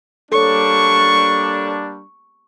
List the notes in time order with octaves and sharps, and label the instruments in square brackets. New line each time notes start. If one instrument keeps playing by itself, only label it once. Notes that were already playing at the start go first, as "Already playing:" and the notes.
[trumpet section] G3 A#3 D4 [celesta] A4 C#5 [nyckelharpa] C#6